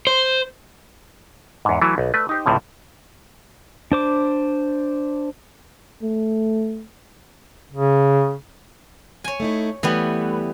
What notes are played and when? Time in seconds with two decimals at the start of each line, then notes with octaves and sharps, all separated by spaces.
0.07 C5
1.65 E2 G#2
1.82 E3 F#3 A3
1.98 B1
2.14 A3 B4 D5
2.29 D#4 G4 C5
2.46 C#2 A2 C3 F3
3.92 D4 C5 D6
6.02 A3
7.72 C#3
9.24 C#5 G#5
9.40 A3 D#4 E4
9.83 E3 G3 A3 B3